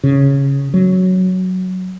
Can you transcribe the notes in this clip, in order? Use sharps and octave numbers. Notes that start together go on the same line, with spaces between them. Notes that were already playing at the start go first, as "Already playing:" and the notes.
C#3
F#3